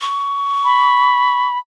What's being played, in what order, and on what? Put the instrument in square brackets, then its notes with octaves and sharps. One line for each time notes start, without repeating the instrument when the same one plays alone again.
[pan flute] C#6
[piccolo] B5